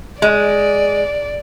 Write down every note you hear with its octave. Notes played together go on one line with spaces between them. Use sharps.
G#3 D5